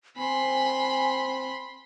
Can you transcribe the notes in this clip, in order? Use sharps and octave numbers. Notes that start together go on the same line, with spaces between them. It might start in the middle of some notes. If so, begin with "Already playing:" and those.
C4 G#5 B5 C6